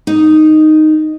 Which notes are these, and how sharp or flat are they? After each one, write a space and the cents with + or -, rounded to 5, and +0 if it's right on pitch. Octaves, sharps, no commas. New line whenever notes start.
D#4 -5